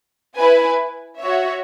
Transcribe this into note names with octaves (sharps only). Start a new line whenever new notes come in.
E4 B4 G#5
F#4 C#5 E5